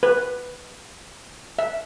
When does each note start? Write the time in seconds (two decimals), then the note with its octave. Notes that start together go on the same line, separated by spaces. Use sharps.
0.03 B4
1.59 E5